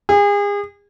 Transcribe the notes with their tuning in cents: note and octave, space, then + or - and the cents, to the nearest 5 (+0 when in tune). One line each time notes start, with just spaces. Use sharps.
G#4 -35